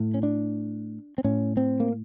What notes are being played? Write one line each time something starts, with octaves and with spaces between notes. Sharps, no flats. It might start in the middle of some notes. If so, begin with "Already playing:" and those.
Already playing: A2
C#4
D4
C4
A2 C#4
C4
A#3